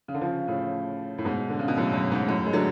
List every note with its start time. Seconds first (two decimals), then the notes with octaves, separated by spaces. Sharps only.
0.08 C#3
0.14 D3
0.21 C#3 F3
0.48 A2 C#3
1.18 A2
1.25 G#2 B2
1.49 D3
1.59 C#3
1.68 B2
1.77 F#2 A2
1.93 F#2
2.12 G#2
2.27 F#2 A2
2.46 G#3
2.53 D3 F#3